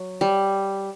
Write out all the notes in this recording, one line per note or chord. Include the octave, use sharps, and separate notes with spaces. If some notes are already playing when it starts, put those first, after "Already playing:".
Already playing: F#3
G3